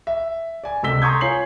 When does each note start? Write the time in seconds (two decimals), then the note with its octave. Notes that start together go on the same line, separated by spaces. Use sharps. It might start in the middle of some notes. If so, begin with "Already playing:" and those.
0.07 E5
0.64 D5 G#5
0.83 C#2 C3 A4 E6 B6 G7
1.02 A#5 C6 C#6 D#6 G6 G#6
1.21 F4 C#5 G#5 C7 F#7